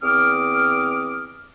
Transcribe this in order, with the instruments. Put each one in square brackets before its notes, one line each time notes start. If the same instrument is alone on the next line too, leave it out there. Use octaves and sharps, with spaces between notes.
[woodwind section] E2 C4 D6 D#6 F6